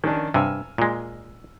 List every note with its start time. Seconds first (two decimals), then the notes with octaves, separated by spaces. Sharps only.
0.04 D#3 C#4 D4
0.34 G2 C3 G#5 E6 F6
0.78 A#2 G#3